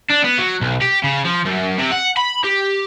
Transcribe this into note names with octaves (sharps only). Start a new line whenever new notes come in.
D4
B3
F#3
B1
G4
C#3
F3
F#2
C3
F#5
B5
G4